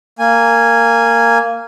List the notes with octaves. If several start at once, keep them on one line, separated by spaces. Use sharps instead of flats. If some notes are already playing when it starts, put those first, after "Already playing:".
A#3 G#5